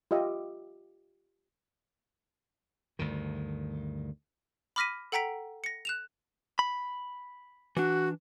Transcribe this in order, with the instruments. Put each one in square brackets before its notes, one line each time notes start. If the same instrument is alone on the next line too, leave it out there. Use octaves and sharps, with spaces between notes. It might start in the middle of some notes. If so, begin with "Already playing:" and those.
[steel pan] F4 G4 D#5 E5
[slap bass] D2 G2 D#3
[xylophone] B5 D6 F6 A#6 B6 D#7
A4 F#5 G5 A#5 B6 D7
A#6 C#7
F#6 E7 F7
[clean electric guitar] B5
[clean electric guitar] E3 D4 [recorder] F#4